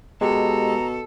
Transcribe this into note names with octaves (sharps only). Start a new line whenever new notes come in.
B2 G#3 G4 A4 A#5